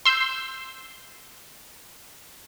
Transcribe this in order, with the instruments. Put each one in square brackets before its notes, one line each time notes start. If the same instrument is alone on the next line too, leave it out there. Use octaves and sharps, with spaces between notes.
[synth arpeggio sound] C6 E6 G6